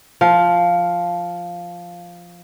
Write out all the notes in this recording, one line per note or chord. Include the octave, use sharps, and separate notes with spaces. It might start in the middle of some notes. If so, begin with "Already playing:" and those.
F3 F5